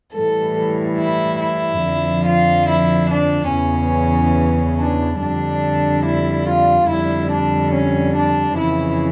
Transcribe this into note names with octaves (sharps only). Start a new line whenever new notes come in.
A2 E3 G3 A4
E4
E4
F2 D3 F3
F4
E4
D4
E2 C#3 E3 C#4
D4
F2 D3 G3 D4
E4
F4
F2 D3 G3 E4
D4
C#4
D4
F2 C#3 E3 E4